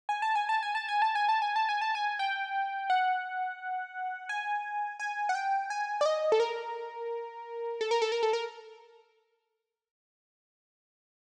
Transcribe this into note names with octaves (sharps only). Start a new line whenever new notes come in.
G#5
A5
G#5
A5
G#5
A5
G#5
A5
G#5
A5
G#5
A5
G#5
A5
G#5
G5
F#5
G#5
G#5
F#5
G5
G#5
D5
D#5
A4
A#4
A4
A#4
A4
A#4
A4
A#4